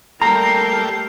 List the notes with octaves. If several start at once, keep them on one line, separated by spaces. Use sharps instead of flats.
G3 A3 A#3 G4 A#4 A#5 C7